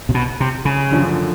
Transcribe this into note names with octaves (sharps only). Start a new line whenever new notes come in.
C3
B2
C3
C#3
F#2 D3 F3 A3